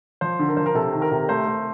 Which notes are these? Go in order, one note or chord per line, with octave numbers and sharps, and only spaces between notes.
F3 C5
D3
A#4
F3 C5
A#4
C3 A4
D#3
A#4
C3
A3 C5
A3